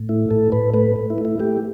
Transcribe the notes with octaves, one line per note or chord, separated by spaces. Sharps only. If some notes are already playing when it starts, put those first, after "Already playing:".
Already playing: A2
A3 E4
A2 A4
A2 B4
A3 B4
A3
E4
A3
E4
A3 G4